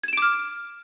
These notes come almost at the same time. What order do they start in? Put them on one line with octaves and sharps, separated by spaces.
G#6 E7 D7 D6 F6